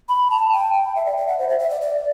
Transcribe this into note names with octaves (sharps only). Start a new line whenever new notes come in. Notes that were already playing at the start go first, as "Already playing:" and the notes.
B5
A5
G5
G5
E5
D5
E5
F#5
C5
E5
E5
D5
D5